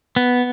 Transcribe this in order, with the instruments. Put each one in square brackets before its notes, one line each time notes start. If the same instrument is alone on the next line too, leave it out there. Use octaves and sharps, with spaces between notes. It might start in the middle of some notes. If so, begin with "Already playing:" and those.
[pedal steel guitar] B3